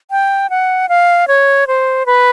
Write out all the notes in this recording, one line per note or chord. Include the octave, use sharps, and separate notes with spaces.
G5
F#5
F5
C#5
C5
B4